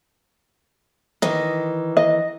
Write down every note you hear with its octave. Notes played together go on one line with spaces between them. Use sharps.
D#3 E3 D#5
D#5